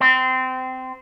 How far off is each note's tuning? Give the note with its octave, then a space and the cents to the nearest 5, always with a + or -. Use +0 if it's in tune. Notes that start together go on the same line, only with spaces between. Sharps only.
C4 -20